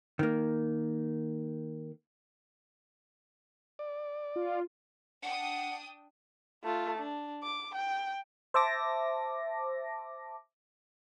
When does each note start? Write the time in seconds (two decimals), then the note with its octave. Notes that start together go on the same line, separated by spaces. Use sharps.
0.19 D#3 A#3
3.79 D5
4.36 F4
5.23 D4 F#5 G5 D#6
6.64 A3 F4
6.99 D4
7.43 D6
7.75 G5
8.54 C5 E5 A5 D6 A#6